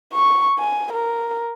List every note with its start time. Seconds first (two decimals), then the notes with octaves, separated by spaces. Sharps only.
0.13 C#6
0.59 G#5
0.93 A#4